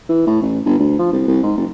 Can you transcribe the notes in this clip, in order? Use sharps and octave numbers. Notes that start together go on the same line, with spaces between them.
E3
A2
A1
G1
D2
F3
C2
C2
G#2
F#1